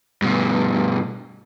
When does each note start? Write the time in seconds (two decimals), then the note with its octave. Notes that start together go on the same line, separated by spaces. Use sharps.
0.22 G2 B2